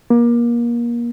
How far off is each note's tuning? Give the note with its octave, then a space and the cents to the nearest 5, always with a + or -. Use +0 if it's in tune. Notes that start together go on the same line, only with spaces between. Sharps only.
A#3 +30